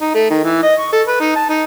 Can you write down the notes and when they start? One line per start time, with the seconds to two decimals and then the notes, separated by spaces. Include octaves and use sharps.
0.01 D#4
0.14 A3
0.30 D#3
0.44 E3
0.63 D#5
0.79 C#6
0.92 A4
1.08 B4
1.20 D#4
1.35 A5
1.49 D#4